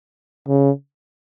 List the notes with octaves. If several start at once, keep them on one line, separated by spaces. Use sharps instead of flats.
C#3